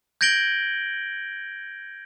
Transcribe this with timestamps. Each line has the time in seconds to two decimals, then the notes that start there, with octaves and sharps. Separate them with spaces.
0.21 G6 G#6 A#6 D7 F#7 G7